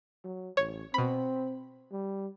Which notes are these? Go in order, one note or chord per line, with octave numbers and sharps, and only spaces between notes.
F#3
A1 C#5
B2 C4 B5
G3